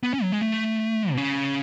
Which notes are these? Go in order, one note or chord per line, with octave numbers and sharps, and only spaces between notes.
B3
C#4
F#3
G#3
A3
B2
C#3